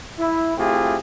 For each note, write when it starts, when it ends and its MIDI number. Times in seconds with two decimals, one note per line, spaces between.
0.18 0.57 64
0.58 0.97 57
0.58 0.97 60
0.58 0.97 64
0.58 0.97 65
0.58 0.97 67
0.58 0.97 68